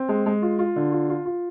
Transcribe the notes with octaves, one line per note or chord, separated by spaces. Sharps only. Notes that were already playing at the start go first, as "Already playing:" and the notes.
Already playing: C4
G#3
G#3
F4
F4
D3
F4
F4
F4